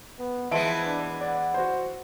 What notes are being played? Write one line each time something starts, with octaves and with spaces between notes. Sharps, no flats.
B3
E3 F3 G#3 B3 E5 A5 D7
D4
D5 F#5
F#4 C5